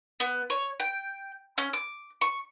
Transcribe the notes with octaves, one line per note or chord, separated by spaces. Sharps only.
B3
C#5
G5
C#4
D6
C#6